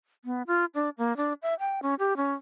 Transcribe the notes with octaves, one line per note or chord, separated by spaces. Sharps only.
B3
F4
D4
A#3
D4
E5
G5
C#4
G4
C#4